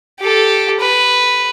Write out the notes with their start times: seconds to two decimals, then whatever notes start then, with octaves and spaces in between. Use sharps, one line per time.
0.20 G4 A4
0.80 B4